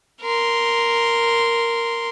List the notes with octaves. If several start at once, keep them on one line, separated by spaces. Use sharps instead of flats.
A#4 C6